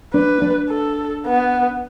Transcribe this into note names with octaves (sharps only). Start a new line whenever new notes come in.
D4 B4
D4
A4
B3